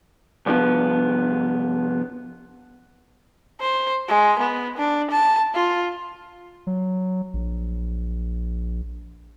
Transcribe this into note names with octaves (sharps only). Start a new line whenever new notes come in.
C2 G2 F3 B3
C5
G#3
B3
D4
A5
F4
F#3
A#1